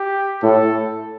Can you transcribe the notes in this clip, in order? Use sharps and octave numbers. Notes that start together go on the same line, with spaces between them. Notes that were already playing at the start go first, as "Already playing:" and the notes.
Already playing: G4
A2 A4